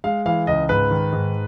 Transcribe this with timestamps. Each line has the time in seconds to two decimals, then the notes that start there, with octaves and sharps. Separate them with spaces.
0.04 G#3 F5
0.26 E3 F5
0.47 C#2 D#5
0.69 G#2 B4
0.91 D#3
1.12 G#2